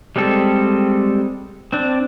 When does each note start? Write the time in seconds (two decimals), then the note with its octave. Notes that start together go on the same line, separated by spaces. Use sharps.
0.16 G3 G#3 C4 A4
1.73 C4 D4